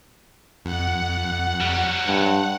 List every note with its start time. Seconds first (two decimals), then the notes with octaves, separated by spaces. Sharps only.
0.65 F2 F#5
1.61 F#3 G3
2.07 G2